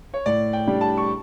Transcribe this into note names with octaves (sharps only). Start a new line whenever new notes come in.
C#5
A2 D5
G5
G3 D4
A5
C#6